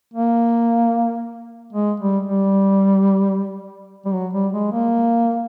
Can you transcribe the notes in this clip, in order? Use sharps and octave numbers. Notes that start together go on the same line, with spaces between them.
A#3
G#3
G3
G3
G3
F#3
G3
G#3
A#3